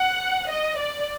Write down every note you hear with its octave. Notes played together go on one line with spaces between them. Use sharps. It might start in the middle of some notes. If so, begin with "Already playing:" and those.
Already playing: F#5
D#5
D5